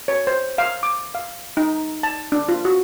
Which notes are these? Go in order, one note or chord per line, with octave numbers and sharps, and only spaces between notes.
C#5
C5
F5
D6
F5
D#4
A5
D4
F4
F#4